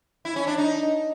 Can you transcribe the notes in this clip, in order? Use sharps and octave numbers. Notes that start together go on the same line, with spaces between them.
E4
C#4
D4
D#4